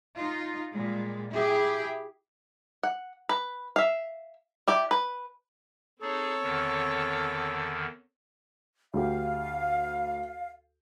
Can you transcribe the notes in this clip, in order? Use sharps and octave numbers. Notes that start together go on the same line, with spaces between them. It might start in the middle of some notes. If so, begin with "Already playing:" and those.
D#4 F4
A#2 G3 G#3
E4 G4 G#4
F#5
B4
E5 F5
E4 G4 D5
B4
C4 D#4 G#4 A4 C#5
E2 D3 D#3
D2 G4 F5